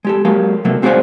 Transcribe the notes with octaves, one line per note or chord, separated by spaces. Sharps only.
G#3 G4 A4
F#3 G#3 A#3 G4 F5
C3 F#3 A3 A#3
G#3 C4 F#4 G#4 C5 F5